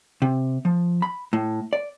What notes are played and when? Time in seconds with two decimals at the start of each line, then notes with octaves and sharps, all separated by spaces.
0.22 C3
0.65 F3
1.02 B5
1.33 A2
1.73 D5